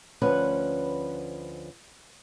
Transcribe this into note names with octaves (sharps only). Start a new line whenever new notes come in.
D2 F3 C#4 B4 F#5